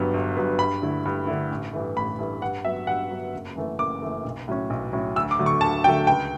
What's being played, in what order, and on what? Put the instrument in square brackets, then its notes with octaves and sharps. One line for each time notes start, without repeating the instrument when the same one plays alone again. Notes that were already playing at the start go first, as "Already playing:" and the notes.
Already playing: [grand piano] G1 G2 F#3 B3
G1
G2 F#3 B3
G2 B5
D3 A3 E4
G2
D3 A3 E4
A1
G2 E3 A3
A1 B5
G2 E3 A3
G2 F#5
F#3 B3 E5
G2 F#5
F#3 B3
F#1
F#2 E3 A3
F#1 D6
F#2 E3 A3
B1
A2 F#3 C#4
B1
A2 F#3 C#4
D2 E6
D6
D3 F#3 A3
C#6
D2 A5
D3 F#3 A3 G5
C#2 G5